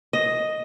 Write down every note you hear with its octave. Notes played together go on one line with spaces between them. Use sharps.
D#5